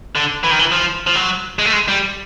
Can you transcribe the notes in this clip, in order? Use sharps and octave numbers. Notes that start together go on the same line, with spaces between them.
D3
E3
D#3
E3
F3
F3
F#3
G#3
A3
G#3
G3